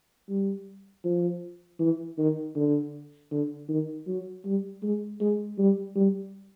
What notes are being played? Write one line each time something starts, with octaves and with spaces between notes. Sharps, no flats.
G3
F3
E3
D#3
D3
D3
D#3
F#3
G3
G#3
G#3
G3
G3